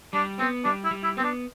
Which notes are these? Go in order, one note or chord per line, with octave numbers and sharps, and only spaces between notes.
G3 D4
B3 C4
G3 D4
E4
G3
E4
B3 C4
D4